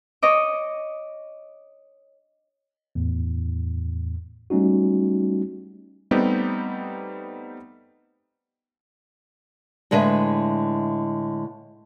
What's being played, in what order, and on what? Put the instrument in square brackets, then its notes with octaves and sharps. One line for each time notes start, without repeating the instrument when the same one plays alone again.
[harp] C#5 D#5 D6
[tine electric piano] E2 A2
G3 A3 C#4 D#4 F#4
[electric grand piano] G3 A3 B3 C4 D#4 G4
[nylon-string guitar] A2 D3 G#3 B4 E5